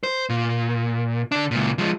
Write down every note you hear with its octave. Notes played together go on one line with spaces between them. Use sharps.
C5
A#2
D3 D4
C#2 A#2
F3 G#3